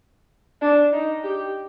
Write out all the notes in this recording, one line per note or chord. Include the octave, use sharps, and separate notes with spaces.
D4
D#4
G4